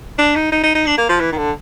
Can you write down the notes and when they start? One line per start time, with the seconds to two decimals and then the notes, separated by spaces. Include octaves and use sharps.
0.18 D4
0.35 D#4
0.52 D#4
0.63 D#4
0.75 D#4
0.86 D4
0.98 A#3
1.09 F3
1.20 E3
1.32 D#3
1.38 D3